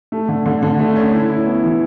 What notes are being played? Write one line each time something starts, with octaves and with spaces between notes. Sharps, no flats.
A3
D3
D3
D3
A3
C#4
E4
E4
B3
E3